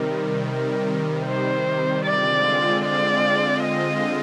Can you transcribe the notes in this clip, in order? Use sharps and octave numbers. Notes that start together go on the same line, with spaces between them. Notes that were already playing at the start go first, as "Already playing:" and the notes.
Already playing: C3 D#3 G3 A#4
A#4
C5
D3 G#3 C4 F4 D5
D5
D#5